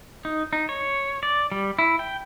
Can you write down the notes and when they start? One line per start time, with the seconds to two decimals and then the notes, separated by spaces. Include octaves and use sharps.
0.25 D#4
0.53 D#4
0.69 C#5
1.23 D5
1.52 G3
1.79 E4
1.99 G5